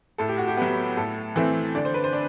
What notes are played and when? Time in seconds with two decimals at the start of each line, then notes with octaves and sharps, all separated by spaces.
0.18 A2 A4
0.28 G4
0.38 F#4
0.48 G4
0.57 F#3 B3
0.97 A2 A4
1.36 E3 A3 C4
1.75 D3 D5
1.85 C5
1.94 B4
2.04 C5
2.13 D4